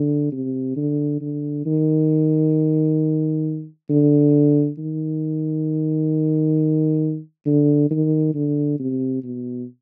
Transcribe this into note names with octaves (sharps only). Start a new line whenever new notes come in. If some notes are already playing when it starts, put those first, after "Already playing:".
Already playing: D3
C3
D3
D3
D#3
D3
D#3
D3
D#3
D3
C3
B2